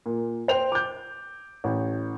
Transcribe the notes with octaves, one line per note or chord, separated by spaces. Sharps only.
A#2
C5 G5 F7
D6 G6
A1